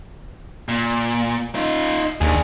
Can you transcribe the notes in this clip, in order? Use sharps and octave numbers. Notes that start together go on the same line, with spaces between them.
A#2
D#4 F4
D#2 D4 G#4